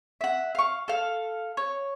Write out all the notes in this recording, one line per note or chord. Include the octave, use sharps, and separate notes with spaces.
E5 F#5
F5 C#6
A4 F5
C#5